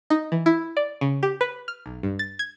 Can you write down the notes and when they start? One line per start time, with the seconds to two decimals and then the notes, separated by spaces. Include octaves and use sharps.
0.10 D#4
0.32 E3
0.46 E4
0.77 D5
1.01 C#3
1.23 G4
1.41 B4
1.68 F6
1.86 B1
2.03 G2
2.19 A6
2.39 G#6